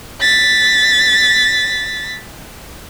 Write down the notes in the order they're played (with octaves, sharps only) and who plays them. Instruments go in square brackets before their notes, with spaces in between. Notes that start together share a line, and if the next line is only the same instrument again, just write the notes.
[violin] A6 B6